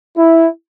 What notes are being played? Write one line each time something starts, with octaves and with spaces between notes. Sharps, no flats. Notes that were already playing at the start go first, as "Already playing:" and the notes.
E4